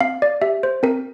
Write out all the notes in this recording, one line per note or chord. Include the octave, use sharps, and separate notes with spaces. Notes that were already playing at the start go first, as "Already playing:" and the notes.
C4 F5
D5
G4 E5
C5
C4 A#4